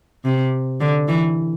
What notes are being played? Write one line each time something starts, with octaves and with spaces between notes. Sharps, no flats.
C3
D3
E3